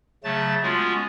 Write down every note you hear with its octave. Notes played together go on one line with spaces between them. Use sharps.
C#3 F#3 A3 A5 A6
G#3 B3 C#4 F4 F#4